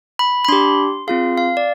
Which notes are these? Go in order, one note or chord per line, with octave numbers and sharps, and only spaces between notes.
B5
B5
D4 G4 C6
C4 F4 G#4 F5
F5
D5